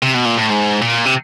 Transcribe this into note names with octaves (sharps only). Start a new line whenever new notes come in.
C3
B2
A#2
A2
G#2
A#2
C3